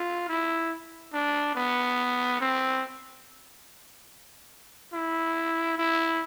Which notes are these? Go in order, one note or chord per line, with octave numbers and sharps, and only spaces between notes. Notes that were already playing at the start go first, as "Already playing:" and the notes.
Already playing: F4
E4
D4
B3
C4
E4
E4